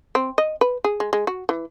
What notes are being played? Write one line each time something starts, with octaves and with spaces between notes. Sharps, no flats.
C4
D#5
B4
G#4
G#3
G#3
F#4
E3